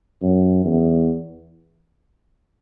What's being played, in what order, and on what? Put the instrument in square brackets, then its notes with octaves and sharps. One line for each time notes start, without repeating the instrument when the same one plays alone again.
[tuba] F#2
E2